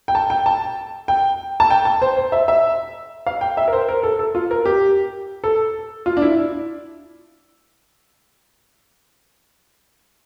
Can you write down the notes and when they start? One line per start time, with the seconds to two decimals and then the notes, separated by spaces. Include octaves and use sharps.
0.08 G5
0.15 A5
0.30 G5
0.46 A5
1.08 G5
1.60 A5
1.70 G5
1.85 A5
2.02 C5
2.17 C5
2.32 E5
2.48 E5
3.27 F5
3.41 G5
3.57 E5
3.68 A#4
3.73 C5
3.89 A#4
4.03 A4
4.19 A4
4.35 F4
4.51 A#4
4.65 G4
5.44 A4
6.06 F4
6.17 D4
6.22 E4